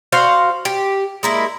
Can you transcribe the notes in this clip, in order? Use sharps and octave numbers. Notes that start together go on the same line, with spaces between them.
F#4 C5 F5
G4
G#3 A#3 E4